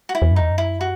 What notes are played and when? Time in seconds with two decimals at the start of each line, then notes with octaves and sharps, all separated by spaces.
0.09 F#4
0.15 E4
0.22 E2
0.31 F#2
0.36 E2 D#4
0.51 F#2
0.58 E4
0.81 F#4